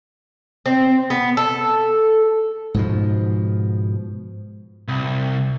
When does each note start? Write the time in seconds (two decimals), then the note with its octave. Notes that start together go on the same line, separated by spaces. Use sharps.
0.66 C4
1.10 B3
1.37 A4
2.74 G#2 B2 F3
4.88 C2